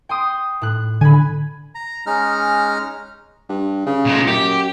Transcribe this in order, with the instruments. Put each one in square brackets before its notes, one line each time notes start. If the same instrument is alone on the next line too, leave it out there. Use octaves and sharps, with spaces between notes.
[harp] G5 C6 D#6
A2 F#6
[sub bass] D3 [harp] G#5 B5
[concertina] A#5
G#3 C#4 D#4 A#5 F6
[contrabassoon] G2
C#3
[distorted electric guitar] A#2 G#3
[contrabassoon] F#2 [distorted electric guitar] G4